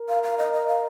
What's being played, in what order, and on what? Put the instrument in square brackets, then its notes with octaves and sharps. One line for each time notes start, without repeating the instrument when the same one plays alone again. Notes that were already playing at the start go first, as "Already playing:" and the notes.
Already playing: [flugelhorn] A#4
[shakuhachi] F5
F5
D#5
D#5
F5